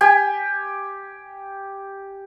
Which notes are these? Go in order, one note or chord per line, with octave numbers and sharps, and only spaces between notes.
G4 G#5